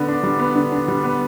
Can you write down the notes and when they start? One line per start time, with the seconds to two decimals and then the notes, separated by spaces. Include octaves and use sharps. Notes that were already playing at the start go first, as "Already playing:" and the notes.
Already playing: D3 B3
0.08 D4
0.23 G3
0.39 B3
0.55 D3
0.72 D4
0.88 G3
1.04 B3